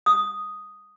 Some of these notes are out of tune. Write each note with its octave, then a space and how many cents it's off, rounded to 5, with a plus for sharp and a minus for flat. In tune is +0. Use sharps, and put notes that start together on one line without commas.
D#6 +0